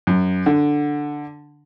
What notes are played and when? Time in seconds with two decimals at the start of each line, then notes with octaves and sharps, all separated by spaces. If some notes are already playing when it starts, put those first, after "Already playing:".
0.07 F#2
0.46 D3